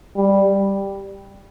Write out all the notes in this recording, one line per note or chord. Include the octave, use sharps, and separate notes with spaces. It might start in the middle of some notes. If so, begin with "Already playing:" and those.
G3